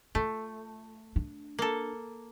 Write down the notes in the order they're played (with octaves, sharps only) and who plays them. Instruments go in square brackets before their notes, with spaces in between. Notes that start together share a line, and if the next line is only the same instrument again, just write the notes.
[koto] A3 [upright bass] F4
[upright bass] D4
[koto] A#3 A4